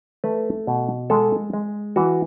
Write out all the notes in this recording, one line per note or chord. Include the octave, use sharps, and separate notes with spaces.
A3 B4
B2
G#3 A4
G#3
E3 F#4